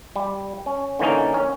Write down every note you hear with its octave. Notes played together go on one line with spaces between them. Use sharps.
G3
C#4
D3 E3 A#3 C#4 D#4
C#4